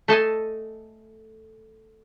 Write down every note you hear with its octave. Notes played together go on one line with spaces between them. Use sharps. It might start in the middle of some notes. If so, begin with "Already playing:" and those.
A3 A4 D#5 G#5